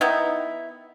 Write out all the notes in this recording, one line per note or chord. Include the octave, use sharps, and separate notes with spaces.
D#3 B3 D#4 E4